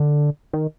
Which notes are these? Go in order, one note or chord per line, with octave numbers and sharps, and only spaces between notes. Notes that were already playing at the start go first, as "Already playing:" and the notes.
Already playing: D3
D#3